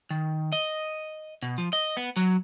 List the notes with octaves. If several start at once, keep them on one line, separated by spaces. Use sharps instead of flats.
D#3
D#5
B2
F3
D#5
B3
F#3